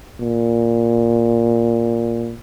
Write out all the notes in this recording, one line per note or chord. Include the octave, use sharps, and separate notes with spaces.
A#2